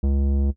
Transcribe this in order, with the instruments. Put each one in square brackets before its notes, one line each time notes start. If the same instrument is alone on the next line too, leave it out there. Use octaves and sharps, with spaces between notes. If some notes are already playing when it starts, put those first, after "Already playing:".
[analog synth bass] C#2